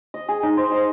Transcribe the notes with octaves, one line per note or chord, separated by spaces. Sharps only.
D#5
G#4
D#4
C5
D#5